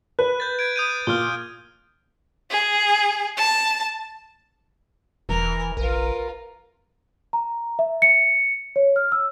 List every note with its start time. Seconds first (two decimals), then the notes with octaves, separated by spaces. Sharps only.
0.19 B4 F#6
0.40 G6 A6
0.59 G#6 D7
0.76 D#6 G6 D#7
1.07 A#2 F6 G7
2.50 G#4
3.37 A5
5.29 E1 E3 A#4
5.77 A#1 F4 A#4 B4
7.33 A#5
7.79 E5
8.02 C#7
8.76 C#5
8.96 F6
9.12 E6